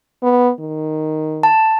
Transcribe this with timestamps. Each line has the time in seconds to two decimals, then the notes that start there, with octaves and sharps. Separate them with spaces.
0.23 B3
0.59 D#3
1.43 A5